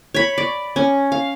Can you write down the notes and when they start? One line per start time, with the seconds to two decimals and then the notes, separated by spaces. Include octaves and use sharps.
0.14 C#5 B5
0.38 D5
0.76 C#4
1.12 F5